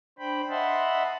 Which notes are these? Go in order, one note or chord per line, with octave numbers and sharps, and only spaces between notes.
D4 C5 G5 B5
D#5 E5 F#5 A5 B5 C6